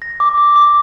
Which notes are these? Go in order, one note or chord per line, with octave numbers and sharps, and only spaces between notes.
A#6
D6
D6
D6